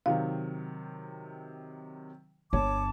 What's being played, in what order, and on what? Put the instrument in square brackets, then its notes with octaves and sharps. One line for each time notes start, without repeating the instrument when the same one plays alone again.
[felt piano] C3 D#3 F#3 [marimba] F5
[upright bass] G1 [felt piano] C#5 [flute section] A5 D6